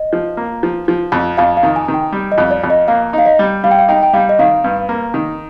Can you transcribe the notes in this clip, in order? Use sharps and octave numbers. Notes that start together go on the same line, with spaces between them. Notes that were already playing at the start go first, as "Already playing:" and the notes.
Already playing: D#5
F3
A#3
F3
F3
F2
F2 F5
F5
D#3
G#5
D#3
G5
G3
D#5
F2
D5
F2
D#5
A#3 F5
D#4 F5
D#5
G3
G3 F5
G5
F5
D#4 G5
G5
G3 F5
D#5
D#3 F5
G2
A#3
D#3